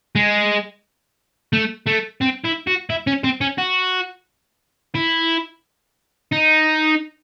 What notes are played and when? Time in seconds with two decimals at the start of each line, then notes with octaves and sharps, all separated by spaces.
0.15 G#3
1.53 A3
1.86 A3
2.21 C4
2.44 E4
2.67 F#4
2.90 E4
3.07 C#4
3.24 C4
3.41 C#4
3.58 F#4
4.95 E4
6.33 D#4